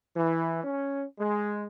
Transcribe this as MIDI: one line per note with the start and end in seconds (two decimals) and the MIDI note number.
0.17 0.64 52
0.64 1.05 61
1.19 1.66 56